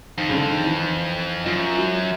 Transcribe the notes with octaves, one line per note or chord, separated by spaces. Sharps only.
F2 D#3
C#3
D3
D#3
E3
F#2 F3
F#3